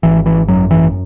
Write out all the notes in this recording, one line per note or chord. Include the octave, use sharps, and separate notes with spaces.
G#1 E3
E3
F#2 F#3
E3